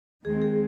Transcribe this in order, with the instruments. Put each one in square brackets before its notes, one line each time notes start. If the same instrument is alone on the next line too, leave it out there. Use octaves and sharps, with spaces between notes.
[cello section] D#2 D#3 G#3 C4 [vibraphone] G#4
[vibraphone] G#4